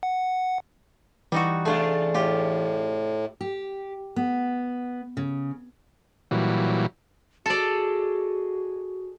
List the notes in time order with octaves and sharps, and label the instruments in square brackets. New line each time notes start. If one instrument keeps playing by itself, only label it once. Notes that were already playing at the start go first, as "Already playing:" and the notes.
[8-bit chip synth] F#5
[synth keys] E3 [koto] G3 D#4 F#4
[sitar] C3 D4 G#4 [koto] A3 F4
[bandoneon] A2 [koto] F4 G4
[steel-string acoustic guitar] G4
B3
C#3
[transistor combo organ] A#2 E3 F#3 G3
[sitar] G#3 [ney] F#4 [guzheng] A4 D5